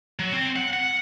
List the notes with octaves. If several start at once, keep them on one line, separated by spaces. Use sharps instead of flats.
F#3
C4
F#5
F#5